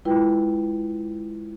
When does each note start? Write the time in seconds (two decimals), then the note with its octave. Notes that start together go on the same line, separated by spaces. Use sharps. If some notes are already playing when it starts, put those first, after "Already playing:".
0.05 G#3 E4 F4 B4 G5